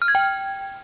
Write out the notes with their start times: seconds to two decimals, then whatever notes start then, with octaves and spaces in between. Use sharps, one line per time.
0.02 F6
0.08 G#6
0.15 G5